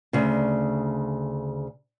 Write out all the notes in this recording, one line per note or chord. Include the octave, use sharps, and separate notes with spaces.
D2 C#3